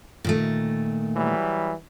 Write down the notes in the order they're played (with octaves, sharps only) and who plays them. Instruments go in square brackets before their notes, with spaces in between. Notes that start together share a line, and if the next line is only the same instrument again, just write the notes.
[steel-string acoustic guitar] A#2 D#3 A3
[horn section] E3 F#3 G3